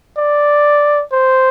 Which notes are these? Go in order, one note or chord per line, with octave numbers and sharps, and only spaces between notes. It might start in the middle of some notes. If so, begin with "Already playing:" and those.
D5
C5